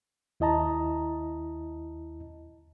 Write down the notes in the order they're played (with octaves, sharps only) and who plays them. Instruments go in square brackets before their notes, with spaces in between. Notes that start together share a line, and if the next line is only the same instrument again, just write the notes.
[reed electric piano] D#2 E4 D#5 A5 A#5